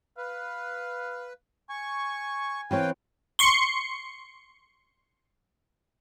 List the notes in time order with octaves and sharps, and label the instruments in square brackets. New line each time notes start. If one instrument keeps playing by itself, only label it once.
[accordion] B4 [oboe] F5
[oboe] G#5 [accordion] C#6
[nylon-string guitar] E3 C4 C#5 [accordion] B4 F5 G5
[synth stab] C6 C#6 C#7